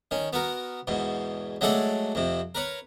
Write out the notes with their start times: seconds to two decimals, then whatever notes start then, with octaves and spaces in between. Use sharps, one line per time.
0.11 D#3 C#4
0.33 B3 F#4 A#4
0.87 E2 G#2 B2
1.61 F#3 G#3 A3 A4 D5
2.15 F2 C3
2.55 A#4 B4 C#5